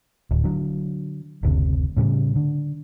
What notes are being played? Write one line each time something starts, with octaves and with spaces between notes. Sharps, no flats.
D1
D3 F#3
F#1 D2 C3
A2 C#3 F#3 G3
D3